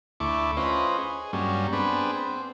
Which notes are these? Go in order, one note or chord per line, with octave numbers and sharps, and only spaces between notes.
D2 A3 E4 C#6 D6
C#4 F4 B4 C5 D#5
G#4
G2 F#3 G3 A#3 C#4
B3 C4 D4 G#4 B4
C4